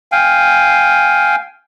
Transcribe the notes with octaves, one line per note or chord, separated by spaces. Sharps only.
F5 G5 G#5